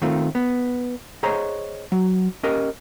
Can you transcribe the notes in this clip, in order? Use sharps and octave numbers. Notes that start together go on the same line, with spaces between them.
D#3 A3 C4 F4
B3
G#4 C5 C#5 D#5 A#5
F#3
C#4 G4 A#4 D#5